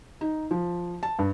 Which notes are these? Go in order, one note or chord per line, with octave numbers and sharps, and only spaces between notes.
D#4
F3
A5
G2